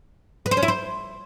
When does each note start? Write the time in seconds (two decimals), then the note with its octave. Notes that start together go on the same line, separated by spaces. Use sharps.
0.46 B4
0.51 C5
0.57 C#4
0.63 E4
0.68 C5